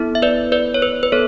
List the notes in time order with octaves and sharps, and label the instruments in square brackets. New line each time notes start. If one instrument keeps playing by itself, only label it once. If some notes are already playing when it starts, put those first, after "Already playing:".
Already playing: [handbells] B3 E4 A4
E5
B4 D5
B4 D5
C#5
B4
B4
B3 A4 C#5